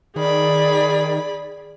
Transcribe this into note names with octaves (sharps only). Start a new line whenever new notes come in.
D#3 G#4 D5 B5